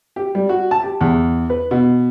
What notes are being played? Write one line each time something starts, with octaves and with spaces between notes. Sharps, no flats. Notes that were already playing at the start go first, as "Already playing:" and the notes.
G4
G3
F#4
A5
G4
E2
B4
B2